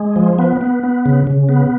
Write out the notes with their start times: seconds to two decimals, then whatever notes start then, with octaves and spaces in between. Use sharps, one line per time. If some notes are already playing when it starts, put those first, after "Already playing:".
Already playing: G#3
0.16 F3
0.39 B3
0.61 B3
0.83 B3
1.06 C#3
1.27 C#3
1.49 B3